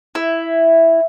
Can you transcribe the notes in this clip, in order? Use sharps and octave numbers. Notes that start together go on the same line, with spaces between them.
E4